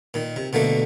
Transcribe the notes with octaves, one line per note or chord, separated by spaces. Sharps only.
A#2 D#3
C3
B2 D3 A3 A#3